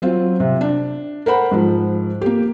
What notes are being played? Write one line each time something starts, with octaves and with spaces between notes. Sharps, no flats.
F#3 C4 F4
C3
D4
A#4 C5 F#5 B5
G#2 F3
A#3 G4